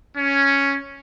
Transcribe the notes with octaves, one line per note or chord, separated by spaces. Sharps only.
C#4